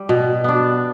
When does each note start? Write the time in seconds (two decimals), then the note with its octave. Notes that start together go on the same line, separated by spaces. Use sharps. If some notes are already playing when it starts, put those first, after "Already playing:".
Already playing: G3
0.09 B2
0.44 B3 D4